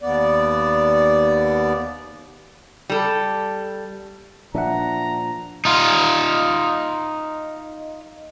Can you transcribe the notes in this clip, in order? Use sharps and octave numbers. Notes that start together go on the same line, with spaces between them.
D#2 B3 D5
G3 A4
A#2 F3 D4 E5 F#5 A#5
D#4 F4